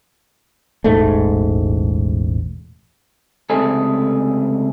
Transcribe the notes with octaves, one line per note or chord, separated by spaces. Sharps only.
E1 A1 G#2 A3
C#2 C3 A3 G#4 A4